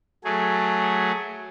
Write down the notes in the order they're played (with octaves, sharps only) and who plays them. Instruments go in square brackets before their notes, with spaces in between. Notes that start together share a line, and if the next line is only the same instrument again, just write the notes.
[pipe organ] F#3 A3 G#4